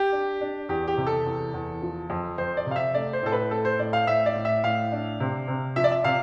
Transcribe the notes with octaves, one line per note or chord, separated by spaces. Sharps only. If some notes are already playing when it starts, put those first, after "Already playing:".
Already playing: G4
D4
D4
E2 G4
G4
C3
A4
E2
E2
F3
F2
F2 C5
D5
C3
F5
E5
A3 D5
C5
A2 A4
B4
A3 A4
C5
A2 D5
F5
A2 E5
D5
A2
E5
A2 F5
D4
C3
C3
F3 E5
D5
E5
C3 F5